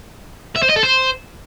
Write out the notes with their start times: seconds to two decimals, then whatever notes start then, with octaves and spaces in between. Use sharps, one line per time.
0.56 E5
0.63 C5
0.69 D#5
0.76 A4
0.83 C5